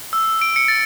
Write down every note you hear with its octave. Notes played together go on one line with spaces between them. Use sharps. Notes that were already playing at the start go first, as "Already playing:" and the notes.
E6
D7
C#7
A6